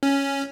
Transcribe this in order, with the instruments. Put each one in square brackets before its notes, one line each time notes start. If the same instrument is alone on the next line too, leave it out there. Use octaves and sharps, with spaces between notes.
[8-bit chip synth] C#4